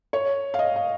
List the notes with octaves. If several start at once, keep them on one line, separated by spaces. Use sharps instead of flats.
C#5
F5
D#5
F5